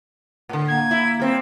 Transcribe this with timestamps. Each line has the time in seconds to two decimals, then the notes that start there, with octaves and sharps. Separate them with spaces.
0.49 A2 D3
0.68 A#3 G#6
0.91 E4
1.20 G3 C4